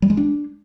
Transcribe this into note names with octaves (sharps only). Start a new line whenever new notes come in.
G3
G#3
D4